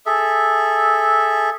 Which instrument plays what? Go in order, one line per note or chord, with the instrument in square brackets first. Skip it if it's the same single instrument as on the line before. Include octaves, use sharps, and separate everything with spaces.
[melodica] G#4 A4 E5